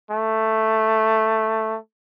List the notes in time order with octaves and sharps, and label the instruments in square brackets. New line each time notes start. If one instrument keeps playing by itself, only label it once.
[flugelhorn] A3